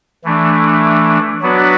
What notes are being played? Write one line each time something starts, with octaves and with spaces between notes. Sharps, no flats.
E3 A3 D4
F#3 B3 D4 F#4 B4